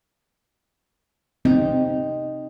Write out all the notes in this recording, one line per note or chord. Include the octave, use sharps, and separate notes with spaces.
C4 D#4